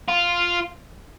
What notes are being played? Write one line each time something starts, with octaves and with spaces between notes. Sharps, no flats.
F4